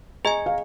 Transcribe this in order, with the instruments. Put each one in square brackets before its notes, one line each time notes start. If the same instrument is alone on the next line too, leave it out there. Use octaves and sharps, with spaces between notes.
[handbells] G#4 D#5 G#5 [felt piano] A#5
[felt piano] F5